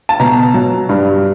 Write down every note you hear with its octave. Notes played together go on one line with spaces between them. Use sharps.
A5
B2 A#5
F#3
G2